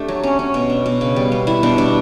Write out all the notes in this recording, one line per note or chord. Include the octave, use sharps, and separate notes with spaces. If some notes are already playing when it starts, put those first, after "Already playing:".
Already playing: A3 D4 G4
F#3
C#4
C#4
B2
D4
B2
C#3
G3
B3
G3 E4
B2 D4
G3 D4